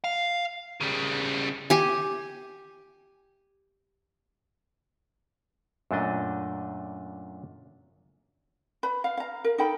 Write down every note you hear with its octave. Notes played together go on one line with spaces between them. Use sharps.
F5
C#3 G3
G4 G#5
F#2 A#2 A3 D4 D#5
B4 B5
F5
F5 A#5
A#4
D#4 A4 G5 B5